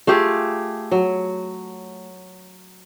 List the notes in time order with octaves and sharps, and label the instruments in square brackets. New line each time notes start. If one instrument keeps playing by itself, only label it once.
[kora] A3 F4 G4 G#4
F#3